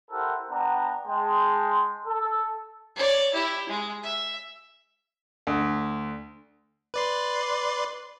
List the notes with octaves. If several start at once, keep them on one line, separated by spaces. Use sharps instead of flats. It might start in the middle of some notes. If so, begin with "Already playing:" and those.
E4 G4 A4 A#4 C5 F#5
B3 D4 F#5 G5 A#5
G#3 G#4 G5 A5 C6
A4
C#5 D5
E4 G4
G#3
E5
D2
B4 D5 C6